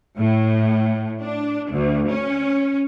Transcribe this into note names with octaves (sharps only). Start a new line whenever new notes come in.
A2
D4
D2
C#4